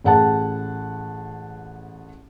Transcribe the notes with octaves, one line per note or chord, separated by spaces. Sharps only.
A1 G#4 F#5 G5 A5